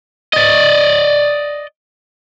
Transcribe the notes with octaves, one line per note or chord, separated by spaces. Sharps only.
D5 D#5